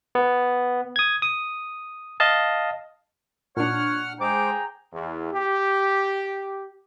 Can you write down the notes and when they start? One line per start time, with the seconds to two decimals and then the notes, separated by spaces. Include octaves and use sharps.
0.15 B3
0.96 D#6 G#6
1.22 D#6
2.20 D#5 F5 A5
3.57 A#2 D4 C#5 F#5 F6
4.20 G#3 G#4 C5 G5 A#5 D6
4.92 E2
5.33 G4